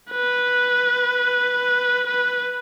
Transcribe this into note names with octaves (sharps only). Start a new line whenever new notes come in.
B4
B4